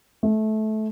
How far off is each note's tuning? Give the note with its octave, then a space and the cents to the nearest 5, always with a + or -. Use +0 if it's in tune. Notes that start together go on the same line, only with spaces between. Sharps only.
A3 -20